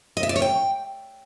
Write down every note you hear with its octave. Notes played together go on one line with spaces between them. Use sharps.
D#5
E5
D5
C#5
G5